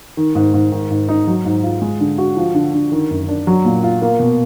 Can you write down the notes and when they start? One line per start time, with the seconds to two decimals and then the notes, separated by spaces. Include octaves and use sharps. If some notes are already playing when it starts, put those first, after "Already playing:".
0.17 D#3
0.35 G#2
0.54 G#2
0.72 D#3
0.91 G#2
1.09 D#4
1.27 F#3
1.45 G#2
1.64 F4
1.82 G#3
2.00 D3
2.18 F#4
2.37 F3
2.55 D3
2.74 D3
2.92 D#3
3.11 F#2
3.29 D4
3.47 F#3
3.65 A#2
3.83 F4
4.02 A#3
4.20 B2